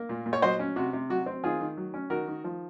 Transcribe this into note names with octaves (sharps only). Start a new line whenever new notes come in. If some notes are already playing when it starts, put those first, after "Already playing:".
Already playing: A#3
A#2
A#2
C#5
F#3 C5 D#5
C#4
C3 F#4
C3
F#3 F#4
C4
D#3 F4 G#4
D#3
F#3
C#4
D#3 F#4 A#4
D#3
F3